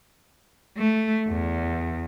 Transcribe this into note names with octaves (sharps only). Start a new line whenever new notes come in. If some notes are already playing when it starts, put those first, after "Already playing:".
A3
E2